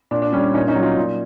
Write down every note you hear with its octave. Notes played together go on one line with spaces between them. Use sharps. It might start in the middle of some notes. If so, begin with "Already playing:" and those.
A#2 D4
D4
G3 C#4
D4
A#2 C#4 D#4
C#4 D#4
F#3
D#4 F4
A#2